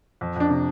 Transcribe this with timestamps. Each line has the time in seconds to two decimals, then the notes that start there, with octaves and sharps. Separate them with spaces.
0.21 F2
0.36 F2 D4
0.50 C3